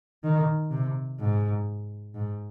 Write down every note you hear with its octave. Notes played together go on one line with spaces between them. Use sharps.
D#3
C3
G#2
G#2